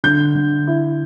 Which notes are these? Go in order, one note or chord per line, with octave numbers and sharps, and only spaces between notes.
D3 G6
D3
E4